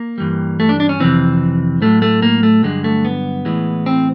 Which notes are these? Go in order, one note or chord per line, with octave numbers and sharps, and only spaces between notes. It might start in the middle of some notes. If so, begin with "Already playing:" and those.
Already playing: A#3
G2 E3 G3
A3
D4
D4
C#4
F2 C3 E3 C4
A2 F#3 A3
A3
A#3
A3
G2 D3 F#3 G#3
A3
B3
A2 E3 G#3
C4